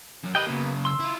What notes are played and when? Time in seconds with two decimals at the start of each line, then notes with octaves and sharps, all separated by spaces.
0.23 F#2 F#3
0.35 G4 A#4 B4 D#5 G5
0.47 C#3 F#3 A#3 B3
0.85 C6 E6
0.99 E4 F4